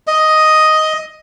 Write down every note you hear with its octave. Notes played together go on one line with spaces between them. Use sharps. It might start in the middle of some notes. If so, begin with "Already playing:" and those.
D#5